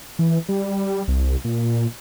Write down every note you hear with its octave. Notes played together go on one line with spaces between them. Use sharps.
E3
G3
C2
A#2